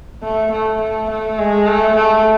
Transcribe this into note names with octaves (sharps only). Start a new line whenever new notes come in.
A3
A3
A3
A3
G#3
A3
A3